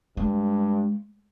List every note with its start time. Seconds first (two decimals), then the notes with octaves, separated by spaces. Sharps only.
0.17 G2 G#3